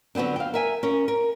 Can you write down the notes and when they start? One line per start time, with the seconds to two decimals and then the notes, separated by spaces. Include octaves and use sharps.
0.15 D3 F#3 B3 C4 D4
0.36 F5 G5
0.54 A#4 E5 G#5
0.83 C#4 A#4
1.08 A#4